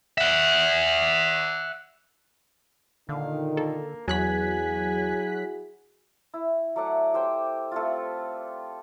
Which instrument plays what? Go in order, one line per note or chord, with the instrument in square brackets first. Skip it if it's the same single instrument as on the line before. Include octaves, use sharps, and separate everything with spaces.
[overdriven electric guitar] E5 F#5
[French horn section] A#2 D#3 [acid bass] D3 [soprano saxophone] F5
[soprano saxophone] A#3 [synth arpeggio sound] A4
[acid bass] E2 [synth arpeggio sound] F#3 F#6 B6 [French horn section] E4 F#4 G#4 [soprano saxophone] G#5
[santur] E4
F#3 A3 D5 F#5
G4 C5 G5
A3 C4 F4